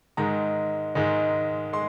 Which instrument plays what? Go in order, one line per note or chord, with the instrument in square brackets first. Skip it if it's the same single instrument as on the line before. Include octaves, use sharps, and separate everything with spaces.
[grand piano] G#2 D#3 G#3 A#5
G#2 D#3 G#3
G#3 C6